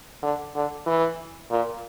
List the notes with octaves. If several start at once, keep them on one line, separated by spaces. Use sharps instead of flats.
D3
D3
E3
A#2